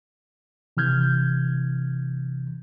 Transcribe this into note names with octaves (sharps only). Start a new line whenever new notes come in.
C3 E3 F6 G6 G#6